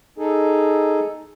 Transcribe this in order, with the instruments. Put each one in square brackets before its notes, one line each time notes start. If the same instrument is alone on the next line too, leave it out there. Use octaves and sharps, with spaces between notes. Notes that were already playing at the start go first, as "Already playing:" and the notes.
[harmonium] D#4 G#4 A4